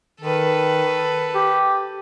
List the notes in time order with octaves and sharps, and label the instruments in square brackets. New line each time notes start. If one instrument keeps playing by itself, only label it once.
[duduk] D#3 [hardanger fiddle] A4 B4
[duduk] G4